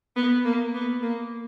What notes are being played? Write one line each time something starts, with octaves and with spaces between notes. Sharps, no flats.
B3
A#3
B3
A#3